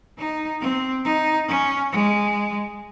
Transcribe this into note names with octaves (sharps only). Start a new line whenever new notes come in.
D#4
C4
D#4
C#4
G#3